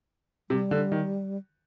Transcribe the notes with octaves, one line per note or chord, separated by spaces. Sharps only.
C3 G3
D3
D#3